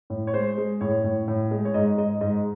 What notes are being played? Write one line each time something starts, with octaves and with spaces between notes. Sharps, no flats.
A2
C#5
G#3 C5
G#3
A2 C#5
A2
A2
G#3
C#5
G#2 D#5
G#2 D#5
G#2 D#5